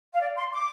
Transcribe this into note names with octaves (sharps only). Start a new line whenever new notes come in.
F5
D5
C6
D6